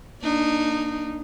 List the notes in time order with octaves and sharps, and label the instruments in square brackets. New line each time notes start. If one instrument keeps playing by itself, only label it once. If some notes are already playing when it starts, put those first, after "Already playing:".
[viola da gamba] A#3 D4 D#4